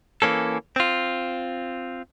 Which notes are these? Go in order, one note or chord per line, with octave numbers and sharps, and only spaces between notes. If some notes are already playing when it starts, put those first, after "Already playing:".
E3 A#3 C#4 A4
C4 F4